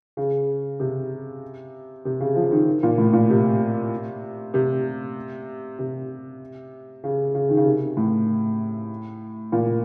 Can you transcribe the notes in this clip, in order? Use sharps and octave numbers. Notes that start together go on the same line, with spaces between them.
C#3
C3
C3
C#3
F3
D#3
A#2
A2
A#2
C3
C3
C3
C#3
C#3
D#3
C#3
C3
A2
A#2